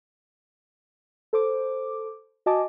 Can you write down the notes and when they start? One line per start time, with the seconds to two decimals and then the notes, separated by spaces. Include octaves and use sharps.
1.33 A4 C5 D6
2.46 F#4 D#5 G#5 A5 D6